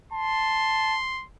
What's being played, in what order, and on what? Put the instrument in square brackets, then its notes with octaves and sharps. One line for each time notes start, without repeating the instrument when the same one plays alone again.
[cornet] A5 [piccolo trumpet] C6